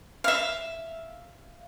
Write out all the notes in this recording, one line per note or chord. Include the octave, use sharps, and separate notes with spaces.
E5 F5